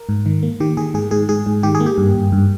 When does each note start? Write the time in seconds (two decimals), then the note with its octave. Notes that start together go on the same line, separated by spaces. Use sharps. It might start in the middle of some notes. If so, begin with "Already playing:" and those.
Already playing: A#4
0.09 G#2
0.26 D#3
0.43 A#3
0.60 D#3 G4
0.77 D#3 G#4
0.94 G#2 G#4
1.11 G#2 G#4
1.29 G#2 G#4
1.46 G#2
1.63 D#3 G4
1.75 G#4
1.80 A#3
1.86 G4
1.98 G2
2.15 G2
2.32 G2